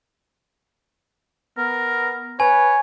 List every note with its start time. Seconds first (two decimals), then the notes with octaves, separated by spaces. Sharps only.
1.58 B3 A#4
2.40 B4 C#5 G#5